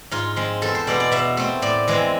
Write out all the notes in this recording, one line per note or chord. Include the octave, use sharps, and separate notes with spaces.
G#2 F4
F3 G#3 C4
E2 A4
C5
B2 G#3 B3 D5
D5
B2 E5
A3 C4
A2 D5
E3 G#3 C4